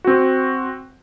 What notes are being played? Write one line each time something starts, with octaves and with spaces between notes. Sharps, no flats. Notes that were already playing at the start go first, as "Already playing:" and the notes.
C4 F#4